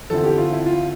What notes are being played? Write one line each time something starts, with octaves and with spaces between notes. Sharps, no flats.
E2 D3 F3 C4 E4 A4
G4
F4
E4
F4